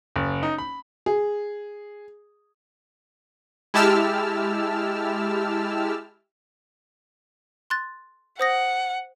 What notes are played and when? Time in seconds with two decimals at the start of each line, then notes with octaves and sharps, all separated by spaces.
0.16 F#1
0.43 D#4
0.58 B5
1.06 G#4
3.74 G#3 E4 G4 A5 E6 F6
7.70 C6 F#6 A6
8.40 C5 F#5 D#6 A#6